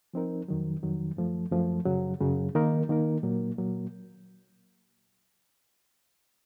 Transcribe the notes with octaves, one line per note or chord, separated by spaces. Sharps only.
F3 C4 D#4 A#4
F2 D#3 F#3
F2 D#3 F#3
F#2 F3 A3
F#2 F3 A3
F#2 C#3 F#3
F#2 C#3 F#3
D#3 A#3 D#4 A#4
D#3 A#3 D#4 A#4
A#2 F#3 A#3
A#2 F#3 A#3